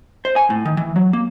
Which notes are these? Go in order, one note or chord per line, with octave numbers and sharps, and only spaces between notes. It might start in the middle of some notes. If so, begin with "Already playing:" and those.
C5
G#5
A2
D#3
E3
F#3
A#3